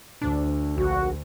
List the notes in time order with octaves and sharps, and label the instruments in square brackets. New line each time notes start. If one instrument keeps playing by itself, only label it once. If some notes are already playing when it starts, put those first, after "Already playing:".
[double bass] D2 [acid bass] D4
[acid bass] A#1 [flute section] F#4